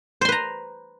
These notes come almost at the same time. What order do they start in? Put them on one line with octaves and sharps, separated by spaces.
C5 C6 B4 A#5